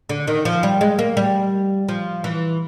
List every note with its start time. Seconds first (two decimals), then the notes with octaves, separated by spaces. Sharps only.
0.09 D3
0.27 D#3
0.45 F3
0.63 G3
0.81 G#3
0.99 A#3
1.17 G3
1.89 F3
2.24 E3